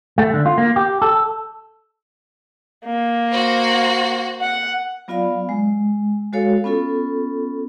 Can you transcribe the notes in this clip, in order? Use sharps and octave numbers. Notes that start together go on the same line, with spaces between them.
A3
D3
F4
A#3
G4
A4
A#3
F#4 C5
F#5
F#3 B3 F4 D5 F5 B5
G#3
G#3 F#4 A4 C#5 F5
B3 C#4 F4 A4